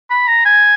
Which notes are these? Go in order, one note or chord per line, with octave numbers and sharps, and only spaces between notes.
B5
A#5
G#5